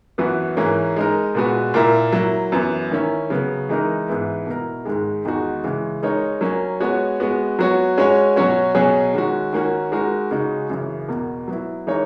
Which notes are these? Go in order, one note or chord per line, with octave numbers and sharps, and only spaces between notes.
F#2 E3 B3 F#4 B4
G#2 E3 A#3 C#4
G#3 D#4 A#4
A#2 G#3 B3 F#4 B4
A#2 A#3 E4 A#4
F#3 A#3 E4
F#2 E3 B3
D#3 A#3 C#4 E4
C#3 F#3 B3
E3 G#3 D#4 A#4
G#2 E3 B3 E4
B2 A#3 E4 A#4
G#2 D#3 G#3
E2 D#3 G#3 D#4 F#4
C#3 E3 G#3
G#3 D#4 A#4 C#5
F#3 A#3 C#4
G#3 B3 F#4 C#5
G#3 B3 F#4
F#3 B3 F#4 C#5
G#3 C#4 F#4 C#5
B2 F#3 C#4 F#4 C#5
B2 F#3 C#4 G#4 C#5
D#3 G#3 C#4 F#4
D#3 A#3 C#4 F#4
G#3 D#4 F#4 A#4
C#3 G#3 D#4 F#4
F#2 C#3 E3
E2 B2 A#3
F#3 B3 E4
E3 G#3 D#4 A#4 C#5